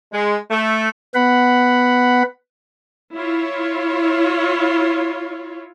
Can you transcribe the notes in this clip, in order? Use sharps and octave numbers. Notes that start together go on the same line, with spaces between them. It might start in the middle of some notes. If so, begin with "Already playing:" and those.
G#3
A3
B3 F#5 B5
E4 F4 C#5